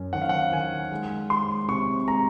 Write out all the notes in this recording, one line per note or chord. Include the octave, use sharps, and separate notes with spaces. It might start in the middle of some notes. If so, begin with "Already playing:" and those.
Already playing: F#2 C#4
D#3 F#5
F5
F#5
D#3 G#5
G#3
G#3 C6
C3 C#6
G#3 A#5